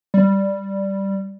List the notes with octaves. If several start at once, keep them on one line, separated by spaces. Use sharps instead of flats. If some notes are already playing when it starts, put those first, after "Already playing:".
G3